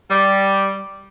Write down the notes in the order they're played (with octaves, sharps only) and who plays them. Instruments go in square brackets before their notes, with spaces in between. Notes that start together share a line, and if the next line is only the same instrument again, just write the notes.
[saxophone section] G3